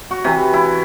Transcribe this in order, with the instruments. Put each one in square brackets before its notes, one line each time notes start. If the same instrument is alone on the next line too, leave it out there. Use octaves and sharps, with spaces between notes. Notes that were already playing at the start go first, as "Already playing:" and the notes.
[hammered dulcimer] F#4
C3 E3
E4